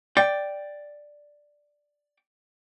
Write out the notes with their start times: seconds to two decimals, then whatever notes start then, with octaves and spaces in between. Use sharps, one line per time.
0.17 D5 G5